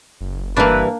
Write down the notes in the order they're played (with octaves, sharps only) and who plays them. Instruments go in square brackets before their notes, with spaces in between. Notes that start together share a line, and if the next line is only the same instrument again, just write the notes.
[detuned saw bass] F#1
[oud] G2 E3 [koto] A#3 D4 [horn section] B4